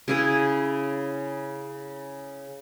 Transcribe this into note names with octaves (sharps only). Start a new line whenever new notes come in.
C#3 E4 G#4